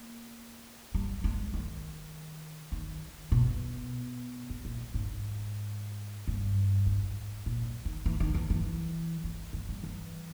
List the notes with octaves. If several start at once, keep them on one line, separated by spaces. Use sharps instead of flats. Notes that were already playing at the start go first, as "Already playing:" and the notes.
Already playing: A#3
G3
G#3
D#3
D#3
B2
G#2
A#2
G#2
G2
G#2
A#2
D#3
E3
D#3
E3
E3
G#3
G#3
G3
E3